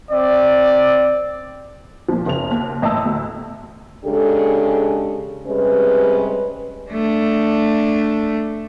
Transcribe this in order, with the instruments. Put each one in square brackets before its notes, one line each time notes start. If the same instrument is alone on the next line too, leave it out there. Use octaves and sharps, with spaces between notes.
[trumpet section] C4 D5
[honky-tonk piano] A#2 F3
F#1 C#3 F7
D#2
A1 D#5 A5 A#5 E6
D2
[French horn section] C#3 G#3 D4 G4 A4
C3 G3 G#3 C#4 B4
[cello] A3 D4